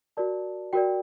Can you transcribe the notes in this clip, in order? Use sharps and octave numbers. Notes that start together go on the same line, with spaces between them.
F#4 A#4 D5 A5
F#4 A#4 D5 G5